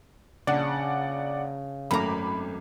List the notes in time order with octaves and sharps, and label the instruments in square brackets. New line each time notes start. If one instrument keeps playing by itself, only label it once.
[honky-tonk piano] A#1 [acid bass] C#3 [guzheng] D4 [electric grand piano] D5 F#5
[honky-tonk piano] G#1 A3 D6 [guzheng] F#2 A#5 [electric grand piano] B5